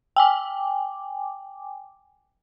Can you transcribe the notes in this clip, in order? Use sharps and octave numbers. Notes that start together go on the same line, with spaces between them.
G5 G#5 D6